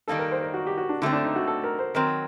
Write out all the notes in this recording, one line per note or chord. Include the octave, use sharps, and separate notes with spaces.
D#3 G3 A#3 D#4 A4
A#4
C5
A#4
F#4
G4
F#4
D4
D3 A3 C4 D4
D4
D#4
F#4
A4
A#4
C5
D#3 F#3 C4 A#4